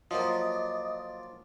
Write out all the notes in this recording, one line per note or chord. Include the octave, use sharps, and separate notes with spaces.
F3 F#3 A#3 D4 F4 D#5